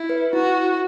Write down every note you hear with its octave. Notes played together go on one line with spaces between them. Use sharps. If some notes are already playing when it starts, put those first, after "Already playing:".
Already playing: E4
B4
E4 F#4